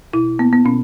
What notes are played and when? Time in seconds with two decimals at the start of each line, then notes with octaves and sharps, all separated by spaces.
0.13 B2 E4
0.39 A#3 B3
0.53 B3
0.65 B2 C#4